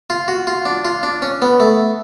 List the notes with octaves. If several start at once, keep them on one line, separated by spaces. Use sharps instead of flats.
F4
F#4
F4
D4
F4
D4
C#4
B3
A3